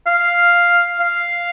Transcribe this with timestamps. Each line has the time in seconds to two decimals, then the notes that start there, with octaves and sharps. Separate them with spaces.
0.07 F5
1.00 F5